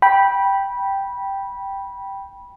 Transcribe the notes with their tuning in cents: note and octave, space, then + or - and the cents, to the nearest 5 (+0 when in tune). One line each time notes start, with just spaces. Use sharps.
G5 +0 B5 -15